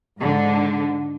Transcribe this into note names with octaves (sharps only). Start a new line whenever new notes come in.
G#2 D3